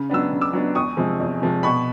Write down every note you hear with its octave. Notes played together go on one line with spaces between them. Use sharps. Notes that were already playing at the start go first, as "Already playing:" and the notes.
Already playing: C#3
F#3 B3 D4 E6
C#3
D6 E6
F#3 B3 D4
E2 C#6 D#6
C3 F3 G#3
E2
C3 F3 G#3
B2 B5 C#6